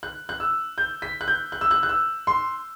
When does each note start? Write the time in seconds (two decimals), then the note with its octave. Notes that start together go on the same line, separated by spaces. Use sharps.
0.03 F#6
0.29 F#6
0.40 E6
0.78 G6
1.02 B6
1.21 F#6
1.28 G6
1.52 F#6
1.61 E6
1.71 F#6
1.83 F#6
1.89 E6
2.27 C6